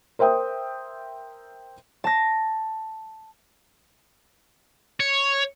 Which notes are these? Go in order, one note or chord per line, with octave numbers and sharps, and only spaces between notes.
A#4 C5 E5 G5 D#6
A5 A#6
C#5